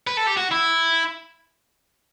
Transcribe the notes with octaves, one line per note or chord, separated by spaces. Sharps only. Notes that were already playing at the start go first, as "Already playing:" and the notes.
B4
A4
G4
F#4
E4